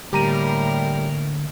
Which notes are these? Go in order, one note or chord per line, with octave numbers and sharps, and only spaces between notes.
A2 D3 G3 A#3 G4 A#4 A#5 D#7